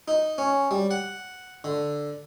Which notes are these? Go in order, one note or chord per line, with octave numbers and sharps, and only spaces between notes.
D#4
C#4
G3
F#5
D3